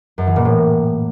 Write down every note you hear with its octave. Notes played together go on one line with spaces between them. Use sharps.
F#2
E3
A#2
A2